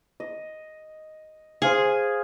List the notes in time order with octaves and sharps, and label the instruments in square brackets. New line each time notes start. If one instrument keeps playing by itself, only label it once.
[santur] D#5
[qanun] G#4 [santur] C5 F5 G#5